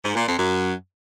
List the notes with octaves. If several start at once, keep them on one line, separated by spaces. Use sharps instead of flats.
G#2
A#2
F2
F#2